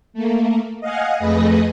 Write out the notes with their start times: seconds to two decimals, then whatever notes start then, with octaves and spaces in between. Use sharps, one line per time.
0.14 A3 A#3
0.81 D#5 F5 F#5 G#5
1.18 F2 A3 G#4 B4 D#5 A#6